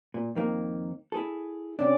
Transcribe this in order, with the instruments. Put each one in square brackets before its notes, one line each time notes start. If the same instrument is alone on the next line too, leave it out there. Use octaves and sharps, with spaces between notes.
[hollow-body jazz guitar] A#2
F2 D#3 A#3
E4 G#4 A4
[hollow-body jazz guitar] C3 D4 [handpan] C#4 D5